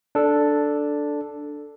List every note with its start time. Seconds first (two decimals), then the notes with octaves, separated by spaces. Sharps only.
0.15 D4 A4